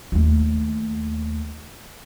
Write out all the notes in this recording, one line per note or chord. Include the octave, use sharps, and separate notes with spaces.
D#2 A3